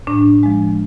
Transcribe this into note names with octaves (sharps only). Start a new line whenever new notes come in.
A2 D4
F3 G#3